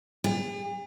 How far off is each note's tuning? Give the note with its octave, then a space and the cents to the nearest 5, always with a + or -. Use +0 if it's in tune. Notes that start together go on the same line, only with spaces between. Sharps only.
G#4 -45